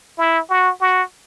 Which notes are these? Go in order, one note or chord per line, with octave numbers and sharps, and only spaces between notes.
E4
F#4
F#4